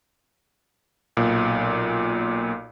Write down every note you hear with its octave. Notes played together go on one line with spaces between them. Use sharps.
B1 A#2